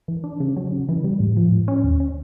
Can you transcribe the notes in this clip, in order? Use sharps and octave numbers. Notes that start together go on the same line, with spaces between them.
E3
D4
C#3
F#3
C#3
E3
G3
A2
F3
A2
C#4
D#2
C#4